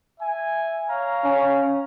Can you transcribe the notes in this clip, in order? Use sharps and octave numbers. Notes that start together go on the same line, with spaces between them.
E5 G#5
C#5 F5 A#5
C#4